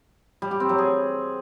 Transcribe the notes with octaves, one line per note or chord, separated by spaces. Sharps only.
G3
G4
C4
F#3
G#4